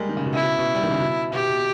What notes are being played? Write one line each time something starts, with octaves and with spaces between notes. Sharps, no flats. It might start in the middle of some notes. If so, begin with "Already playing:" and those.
Already playing: G3 G#3 A#3
D#3
C#3
B2
C#3 E4
B2
B2
G3
D#3
C#3
B2
B2 G4
B2